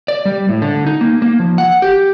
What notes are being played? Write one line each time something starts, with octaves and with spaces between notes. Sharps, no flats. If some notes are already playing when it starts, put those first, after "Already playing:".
D5
G3
A2
D3
D#4
A#3
A#3
F3
F#5
G4